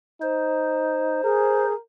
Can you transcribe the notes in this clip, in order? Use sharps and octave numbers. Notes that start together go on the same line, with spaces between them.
D#4 C5
G#4 A#4